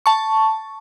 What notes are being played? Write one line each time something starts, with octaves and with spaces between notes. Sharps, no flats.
A5 C#6